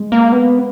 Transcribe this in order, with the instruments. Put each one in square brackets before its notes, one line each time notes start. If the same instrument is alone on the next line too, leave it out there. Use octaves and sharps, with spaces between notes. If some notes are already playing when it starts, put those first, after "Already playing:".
Already playing: [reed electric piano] G#3
[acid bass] A#3
B3